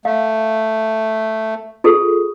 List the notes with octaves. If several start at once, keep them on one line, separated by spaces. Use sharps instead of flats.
A3 F5
F4 G#4 A4